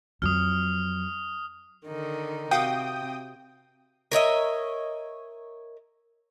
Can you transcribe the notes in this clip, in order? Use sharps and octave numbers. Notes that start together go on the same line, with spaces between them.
F2 F#3 D#6 F6
D3 D#3 D#4
C3 F#4 G4 F5 G5 D#6
A#4 C#5 D#5 E5